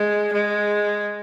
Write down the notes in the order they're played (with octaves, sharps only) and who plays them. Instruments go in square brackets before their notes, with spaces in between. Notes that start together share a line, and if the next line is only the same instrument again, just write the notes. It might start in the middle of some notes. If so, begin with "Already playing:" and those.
Already playing: [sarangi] G#3
G#3